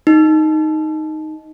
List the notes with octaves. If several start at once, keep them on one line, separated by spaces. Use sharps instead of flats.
D#4